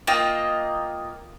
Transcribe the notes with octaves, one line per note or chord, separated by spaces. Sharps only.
A#3 F4 D#5 G5